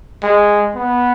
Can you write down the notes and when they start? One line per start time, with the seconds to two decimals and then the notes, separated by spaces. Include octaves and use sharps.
0.23 G#3
0.76 B3